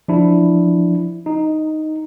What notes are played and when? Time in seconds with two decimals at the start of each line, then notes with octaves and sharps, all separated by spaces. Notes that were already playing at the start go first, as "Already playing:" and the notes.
0.08 F3 D4 E4
1.26 D#4